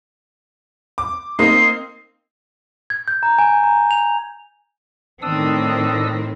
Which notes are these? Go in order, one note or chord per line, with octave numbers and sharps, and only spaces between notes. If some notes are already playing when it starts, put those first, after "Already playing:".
D6
A#3 C4 D#4 C7
G#6
G6
A#5
G#5
A#5
F7
A2 D#3 C4 D4 D#6 E6